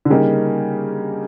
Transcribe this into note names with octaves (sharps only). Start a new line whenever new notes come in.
D3
C#3 G3 A#3 D#4